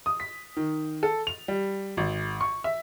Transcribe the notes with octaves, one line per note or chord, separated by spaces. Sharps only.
D#6
B6
D#3
A4
F7
G3
G#1
C#6
E5